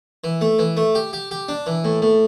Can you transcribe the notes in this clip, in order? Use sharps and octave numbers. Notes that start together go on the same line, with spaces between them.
E3
A3
E3
A3
G4
G4
G4
D4
E3
A2
A2